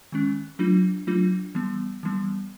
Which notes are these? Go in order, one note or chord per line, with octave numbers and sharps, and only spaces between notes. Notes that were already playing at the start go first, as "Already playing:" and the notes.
D#3 G#3 C#4
F#3 A3 D4 F4
F#3 A3 D4 F4
E3 G3 B3
E3 G3 B3